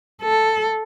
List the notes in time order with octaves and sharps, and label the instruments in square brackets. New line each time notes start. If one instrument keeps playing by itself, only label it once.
[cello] A4